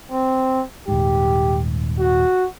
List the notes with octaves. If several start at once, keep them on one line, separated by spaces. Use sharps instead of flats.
C4
D#1 G#2 G4
F#4